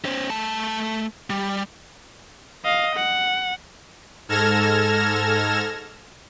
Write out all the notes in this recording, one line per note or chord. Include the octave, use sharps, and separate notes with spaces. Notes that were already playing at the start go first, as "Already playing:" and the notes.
C#4 C5
A3 A5
G3
D#5 F5
F#5
G#2 A4 F6 G#6 A#6 E7